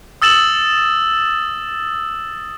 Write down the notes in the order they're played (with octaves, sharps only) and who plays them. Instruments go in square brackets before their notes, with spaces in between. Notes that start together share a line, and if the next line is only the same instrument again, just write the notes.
[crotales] D#6 E6 A6 E7 F#7